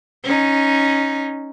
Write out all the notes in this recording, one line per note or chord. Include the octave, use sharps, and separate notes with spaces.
C#4 D#4